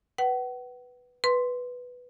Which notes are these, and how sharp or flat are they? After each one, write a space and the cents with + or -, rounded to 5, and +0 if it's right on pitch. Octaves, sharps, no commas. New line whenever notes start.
B4 +0 F#5 +40
B4 +0 C6 +0